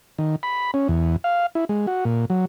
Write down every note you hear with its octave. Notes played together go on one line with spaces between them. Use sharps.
D#3
B5
C#4
E2
F5
E4
G#3
F#4
A#2
F#3